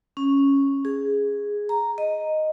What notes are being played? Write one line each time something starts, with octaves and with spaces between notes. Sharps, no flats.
C#4
G#4
A#5
D#5